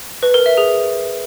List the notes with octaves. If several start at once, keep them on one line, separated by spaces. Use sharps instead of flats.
B4
A#4
E5
G#4